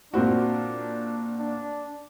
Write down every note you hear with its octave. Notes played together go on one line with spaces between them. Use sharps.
A#2 C4 D4 F#4
D4